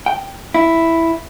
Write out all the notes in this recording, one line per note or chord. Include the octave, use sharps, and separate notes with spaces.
G5
E4